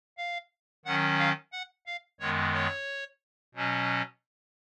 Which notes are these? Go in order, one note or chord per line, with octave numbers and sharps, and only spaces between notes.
F5
D#3 F#3 C#4 F#5
F5
F#5
F5
F#2 D#3 G#3 B3 C#5
C#5
B2 F#3 C#4